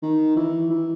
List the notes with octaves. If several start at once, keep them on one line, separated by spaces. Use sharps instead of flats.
D#3
E3
E3